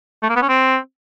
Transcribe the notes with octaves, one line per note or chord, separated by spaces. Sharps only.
A3
A#3
B3
C#4
C4